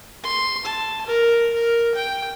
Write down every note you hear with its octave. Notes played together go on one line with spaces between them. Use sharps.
C6
A5
A#4
A#4
G5